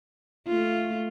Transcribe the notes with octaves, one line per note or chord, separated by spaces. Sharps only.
A3 F4